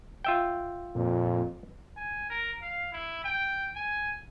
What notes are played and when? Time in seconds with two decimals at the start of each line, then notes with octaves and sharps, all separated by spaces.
0.24 F4 E5 G5
0.95 F2 A#2
1.97 G#5
2.30 A#4
2.62 F5
2.93 E4
3.24 G5
3.75 G#5